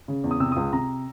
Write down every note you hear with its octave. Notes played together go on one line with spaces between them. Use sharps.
C#3
E2
D#6
C3 E6
C#2 D#6
C3 A#5